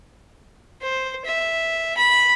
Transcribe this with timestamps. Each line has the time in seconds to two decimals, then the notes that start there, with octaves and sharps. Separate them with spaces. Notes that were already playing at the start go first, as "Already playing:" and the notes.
0.82 C5
1.25 E5
1.97 B5